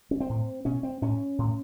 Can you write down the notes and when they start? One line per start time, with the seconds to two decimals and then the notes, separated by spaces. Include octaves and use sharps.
0.11 C#4
0.20 C4
0.29 A2
0.65 B2 C#4
0.83 C4
1.02 A2 C#4
1.38 A2